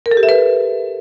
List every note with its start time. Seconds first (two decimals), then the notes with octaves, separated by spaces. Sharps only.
0.06 A#4
0.11 A4
0.17 G4
0.23 E5
0.29 B4